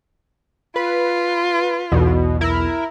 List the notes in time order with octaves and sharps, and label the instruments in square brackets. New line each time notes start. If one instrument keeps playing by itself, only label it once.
[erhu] F4 [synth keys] B4
[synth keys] B1 E2 [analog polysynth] B2
[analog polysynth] E4 A#4